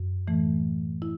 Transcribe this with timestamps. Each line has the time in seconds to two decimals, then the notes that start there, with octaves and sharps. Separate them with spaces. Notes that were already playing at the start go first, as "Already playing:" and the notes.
Already playing: F#2
0.28 A2 E3 A3
1.02 E4